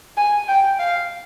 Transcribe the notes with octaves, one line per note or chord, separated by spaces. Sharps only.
G#5
G5
F5